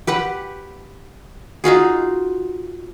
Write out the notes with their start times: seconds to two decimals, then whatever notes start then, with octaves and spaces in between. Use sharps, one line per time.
0.07 G4 B4 F#5
1.64 D#4 F4 F#4 G#4